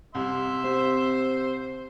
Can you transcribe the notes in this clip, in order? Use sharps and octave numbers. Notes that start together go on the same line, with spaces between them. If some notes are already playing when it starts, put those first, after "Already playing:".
C2 E5 C6
C4 G4 C5